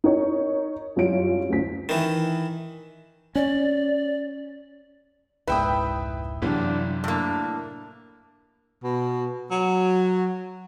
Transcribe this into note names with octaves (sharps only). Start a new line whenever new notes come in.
D#4 A#4 C#5
F#2 G3 E4 F4 C#5 D7
G1 D2 C#4 C5 B6
D#3 E3
C#4 D5
F1 C#2 G#2 E4 B4 G5 D#6
G1 F#2 C3 E3 F#3 G3 D4
A2 A#3 D4
B2
F#3